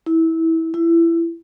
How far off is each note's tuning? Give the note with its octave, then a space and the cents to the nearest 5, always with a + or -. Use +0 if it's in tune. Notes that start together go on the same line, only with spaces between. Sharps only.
E4 -20
E4 +20